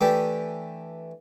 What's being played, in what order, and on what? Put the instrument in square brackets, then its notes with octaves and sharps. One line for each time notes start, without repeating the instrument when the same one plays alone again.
[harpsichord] E3 A3 D4 G4